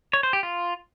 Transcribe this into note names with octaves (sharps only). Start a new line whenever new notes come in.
C#5
C5
G4
F4